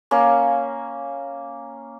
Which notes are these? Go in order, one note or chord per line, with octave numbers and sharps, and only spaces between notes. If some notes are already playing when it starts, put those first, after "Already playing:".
A#3 C#4